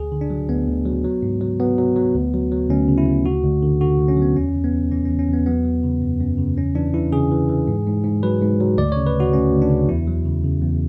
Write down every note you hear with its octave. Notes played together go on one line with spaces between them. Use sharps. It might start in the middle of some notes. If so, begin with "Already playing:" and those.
Already playing: D2 G#4
D3
D4
F#3
D2 B3
D2
F#3
F#3
G#2
F#3
F#3 B3
F#3
F#3
D2
F#3
F#3
D2 C#4
C#3
E4
D2
D3 F#4
D2
D3
D3 F#4
D2
C#4
F#3 B3
E2 C#4
E2
B3
E2
E3 C#4
C#4
E2
C#4
E2 B3
F#3 B3
F#3
C#3
F#2
F#2
C#3
E2 C#4
E3 D4
E3 E4
C#3 G#4
E3
E3
G#2
G#2
G#2
F#3 B4
G#2
F#3
D2 D5
C#3 C#5
B4
D2 F#4
D2 C#4
D2
D4
C#3
E2 E4
F#3
C#3
C#3
E2